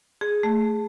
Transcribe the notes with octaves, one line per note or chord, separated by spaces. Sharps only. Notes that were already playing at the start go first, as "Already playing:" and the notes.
G#4
A3